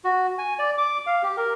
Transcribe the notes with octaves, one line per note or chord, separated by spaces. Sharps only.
F#4
G#5
D5
D6
F5
G4
A#4